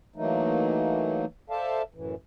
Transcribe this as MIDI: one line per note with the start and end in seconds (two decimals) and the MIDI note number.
0.16 1.25 52
0.16 1.25 54
0.16 1.25 57
0.16 1.25 58
0.16 1.25 63
1.50 1.82 69
1.50 1.82 72
1.50 1.82 74
1.50 1.82 76
1.50 1.82 77
1.50 1.82 81
1.94 2.15 42
1.94 2.15 45
1.94 2.15 52